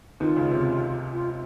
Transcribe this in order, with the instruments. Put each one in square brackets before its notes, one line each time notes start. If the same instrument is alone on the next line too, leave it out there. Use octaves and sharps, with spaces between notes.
[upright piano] D#2 D#3 [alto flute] F4
[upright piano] C#2 C#3
C3
[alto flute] F4